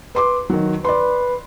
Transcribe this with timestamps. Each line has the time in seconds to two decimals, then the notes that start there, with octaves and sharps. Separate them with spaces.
0.15 B4 C6 D6
0.50 D#3 F#3
0.85 B4 D5 C6